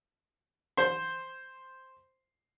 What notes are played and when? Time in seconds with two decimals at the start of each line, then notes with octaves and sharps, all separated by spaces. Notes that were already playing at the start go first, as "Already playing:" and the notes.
0.77 C5 C6